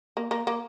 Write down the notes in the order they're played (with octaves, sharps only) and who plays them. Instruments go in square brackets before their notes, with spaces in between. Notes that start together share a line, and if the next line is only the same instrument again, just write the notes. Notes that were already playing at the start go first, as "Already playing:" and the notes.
[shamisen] A#3
A#3
A#3